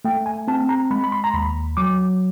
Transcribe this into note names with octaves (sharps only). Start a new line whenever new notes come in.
A3 G5
G#5
C4 A5
A#5
G#3 B5
B5
C6
A#5
D#2 B5
F#3 D6